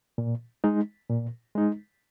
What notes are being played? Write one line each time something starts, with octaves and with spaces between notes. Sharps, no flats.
A#2
G#3 D#4
A#2
G#3 D#4